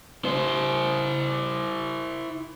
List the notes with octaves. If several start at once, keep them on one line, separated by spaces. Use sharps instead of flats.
E4 C5